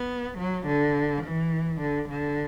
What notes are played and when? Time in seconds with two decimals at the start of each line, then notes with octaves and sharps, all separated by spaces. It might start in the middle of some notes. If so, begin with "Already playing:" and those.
Already playing: B3
0.39 F#3
0.66 D3
1.23 E3
1.81 D3
2.09 D3